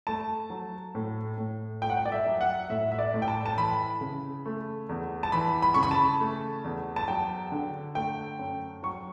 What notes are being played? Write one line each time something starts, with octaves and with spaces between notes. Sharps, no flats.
A3 A5
F#3
A2
A2
A3 G5
F#5
G5
D5
E5
F#3
F#5
A2 E5
E5
D5
A2
G5
A5
A5
E3 B5
C#3
A3
E2
A5
E3 B5
B5
C#3 C#6
B5
A5
A3
E2
A5
F#3 G5
D3
A3 G5
F#2
F#3 C#6